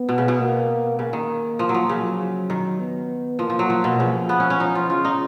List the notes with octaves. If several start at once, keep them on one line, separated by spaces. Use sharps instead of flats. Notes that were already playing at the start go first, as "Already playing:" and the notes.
Already playing: B3
B2
C#3
B2
A#3
C#3 A#3
D#3
F3
F#3
F3
C#3 F#3
D#3
B3
F3 A#3
F3
F#3
F3
B2
C#3 F3
B3
C#4
C#4
F3 D#4
F4
C#3 F4
D#4